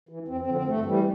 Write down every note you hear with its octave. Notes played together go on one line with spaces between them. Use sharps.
E3
F2 C4
C4
D3 F3
C4
G2 A3
E3 G3